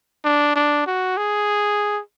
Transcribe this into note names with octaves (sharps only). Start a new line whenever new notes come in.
D4
D4
F#4
G#4